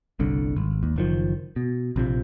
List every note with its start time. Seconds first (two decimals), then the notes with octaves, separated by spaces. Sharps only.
0.19 G1 C2 D3
0.57 G#1
0.83 D#2
0.96 F#1 D#3 F3
1.56 B2
1.96 A#1 C3 F3